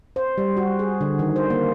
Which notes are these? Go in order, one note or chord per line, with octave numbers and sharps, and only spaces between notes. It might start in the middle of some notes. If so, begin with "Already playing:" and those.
C5
G3
F#4
G#4
D3
D#3
C5
A#3